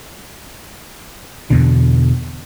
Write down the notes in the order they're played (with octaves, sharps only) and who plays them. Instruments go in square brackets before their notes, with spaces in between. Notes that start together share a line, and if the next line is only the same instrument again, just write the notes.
[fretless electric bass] E2 B2 D3